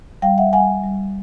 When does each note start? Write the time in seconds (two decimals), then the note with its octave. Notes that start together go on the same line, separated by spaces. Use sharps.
0.22 G3 F5 G5
0.38 E5 F#5
0.53 G3 F#5 G#5
0.84 G3